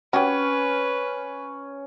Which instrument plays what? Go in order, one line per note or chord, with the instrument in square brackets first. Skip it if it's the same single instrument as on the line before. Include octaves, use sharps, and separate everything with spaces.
[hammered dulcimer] C#4 [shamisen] F#4 G4 [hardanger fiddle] B4